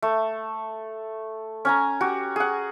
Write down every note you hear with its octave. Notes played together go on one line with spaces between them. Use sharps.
A3
C#4 G#5 A#5
F#4 G4
G#4 F#5